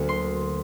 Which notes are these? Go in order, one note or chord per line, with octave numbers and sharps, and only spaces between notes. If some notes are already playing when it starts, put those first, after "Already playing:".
Already playing: D2 D3 F#3 A#3
C6